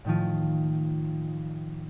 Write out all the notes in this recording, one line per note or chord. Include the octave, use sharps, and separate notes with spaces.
A2 D#3 F3